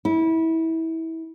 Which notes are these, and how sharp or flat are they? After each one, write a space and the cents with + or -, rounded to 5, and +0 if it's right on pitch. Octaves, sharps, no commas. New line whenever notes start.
E4 -25